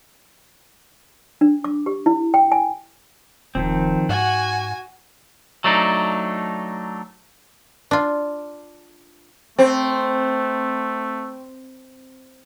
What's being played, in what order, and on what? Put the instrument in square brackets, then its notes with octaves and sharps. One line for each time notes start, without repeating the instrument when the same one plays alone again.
[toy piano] D4
D6
G4
E4
G5
G#5
[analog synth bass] E1 [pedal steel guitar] D#3 F3 C4
[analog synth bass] G#2 [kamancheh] F#4 G#5 [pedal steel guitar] F#5
[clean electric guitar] F#3 A3 D4 D#4
[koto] D4 F4
[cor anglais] A3 [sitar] C4 [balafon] C5